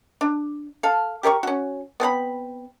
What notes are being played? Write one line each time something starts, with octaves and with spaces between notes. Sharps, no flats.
D4
A4 F5
G4 A#4 E5 C#6
C#4 F#4
B3 C4 C5 B5